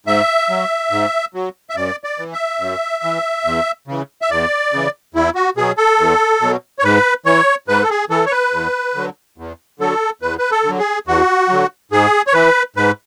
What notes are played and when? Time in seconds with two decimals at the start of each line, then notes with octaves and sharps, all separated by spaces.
0.06 G#2 E5
0.50 F#3
0.91 G#2
1.34 F#3
1.70 E5
1.76 F#2 D5
2.04 D5
2.19 E3
2.33 E5
2.60 F#2
3.04 E3
3.45 E2
3.88 C#3 E3
4.22 E5
4.31 E2 D5
4.73 C#3 E3
5.14 E2 E4
5.35 F#4
5.57 B2 F#3 G#4
5.77 A4
5.99 E2
6.41 B2 F#3
6.79 C#5
6.84 G#2 B4
7.26 E3 C#5
7.68 G#2 B4
7.83 A4
7.90 G#4
8.10 E3 A4
8.26 C#5
8.32 B4
8.53 E2
8.95 D3 F#3
9.38 E2
9.79 D3 F#3 A4
10.22 E2 B4
10.39 B4
10.51 A4
10.64 D3 F#3
10.79 G#4
11.07 E2 F#4
11.49 D3 F#3
11.92 G#2 G#4
12.27 C#5
12.33 E3 B4
12.76 G#2 B4